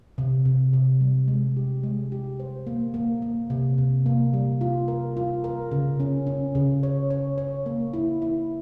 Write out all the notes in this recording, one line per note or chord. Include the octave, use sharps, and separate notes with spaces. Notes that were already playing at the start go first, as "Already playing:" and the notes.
C3
C3
C3
G3
G#3
G4
G#3
G4
C5
A#3
A#3
A#3
C3
C3
A#3
G3
F4
A#4
F4
A#4
C#3
C#4
C#4
C#3
C#5
C#5
C#5
A#3
E4
E4